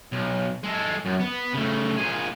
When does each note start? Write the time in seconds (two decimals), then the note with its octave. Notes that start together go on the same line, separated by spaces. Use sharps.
0.13 B1
0.64 G#3 A4
1.05 F#2
1.20 B3
1.54 C#3 A3
1.97 A#2 G#4